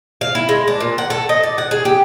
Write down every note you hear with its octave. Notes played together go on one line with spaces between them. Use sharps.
F5
E4
G#3
D4
A#2
F#5
A4
D#5
D5
F#5
G#4
G4